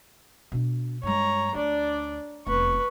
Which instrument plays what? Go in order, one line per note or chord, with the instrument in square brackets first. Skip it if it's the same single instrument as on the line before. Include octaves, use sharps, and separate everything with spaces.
[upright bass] B2 D4
[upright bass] G2 G#3 [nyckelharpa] C#5 A#5
[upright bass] D2 [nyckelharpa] D4 D5
[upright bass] F1 E2 [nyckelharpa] B4 C#6